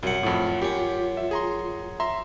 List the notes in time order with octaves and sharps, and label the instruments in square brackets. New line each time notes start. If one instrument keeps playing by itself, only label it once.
[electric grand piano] C2 [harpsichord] F#2 F#5 [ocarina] F#4
[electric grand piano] F2 A2 [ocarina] F4
[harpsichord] F#2 C#4 [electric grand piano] G4
[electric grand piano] E5
G#4 A#5 C6
E5 A#5 C6